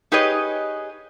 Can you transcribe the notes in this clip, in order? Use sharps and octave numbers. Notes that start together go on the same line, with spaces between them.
D#4 G4 G#4 B4 C#5 D#5